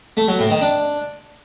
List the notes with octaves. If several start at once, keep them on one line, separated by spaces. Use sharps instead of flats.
A3
F#3
A2
D#3
D4